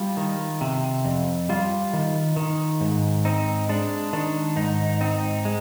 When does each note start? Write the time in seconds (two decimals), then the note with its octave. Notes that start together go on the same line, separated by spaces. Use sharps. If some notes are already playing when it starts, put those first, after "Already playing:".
Already playing: G3 F4
0.17 D#3
0.61 C3
1.05 F2
1.49 G3 F4
1.93 D#3
2.36 D#3
2.81 G#2
3.25 C4 D#4
3.69 G#3 D4
4.13 D#3 D4
4.56 G#2 D#4
5.01 C4 D#4
5.45 G#3